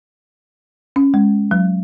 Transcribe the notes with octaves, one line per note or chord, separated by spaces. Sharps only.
C#4
G#3
F#3